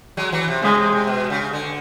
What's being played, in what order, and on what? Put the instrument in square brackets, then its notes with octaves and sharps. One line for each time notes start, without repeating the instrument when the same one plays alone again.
[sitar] F#3 G#3
E3 F#3
C3
[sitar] C#3 [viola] G#3
[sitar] C3
C3
B2
C#3
D3